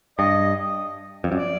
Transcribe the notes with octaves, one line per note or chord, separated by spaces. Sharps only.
G2 D#5
F2
F#2 D5